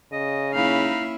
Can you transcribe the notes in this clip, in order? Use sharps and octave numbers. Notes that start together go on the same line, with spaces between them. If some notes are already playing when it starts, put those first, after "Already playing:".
C#3 D#5
A#3 C#4 D#4 E4 F5 B5